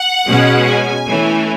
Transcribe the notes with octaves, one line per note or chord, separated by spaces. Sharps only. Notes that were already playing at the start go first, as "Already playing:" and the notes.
Already playing: F#5
B2 G#3 C#4
G#5
E3 A3 C#4